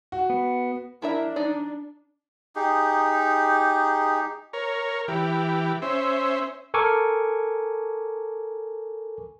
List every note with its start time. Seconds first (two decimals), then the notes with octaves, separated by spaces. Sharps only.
0.12 F#4
0.30 B3
1.02 D4 E4 A#4 E5
1.36 D#4 D5
2.56 D#4 G4 G#4
4.53 A#4 C#5
5.08 E3 G4
5.82 C#4 C5 E5
6.74 A4 A#4 G#5 C#6 D6